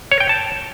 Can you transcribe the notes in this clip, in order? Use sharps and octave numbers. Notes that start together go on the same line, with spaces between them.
C#5
G5
A5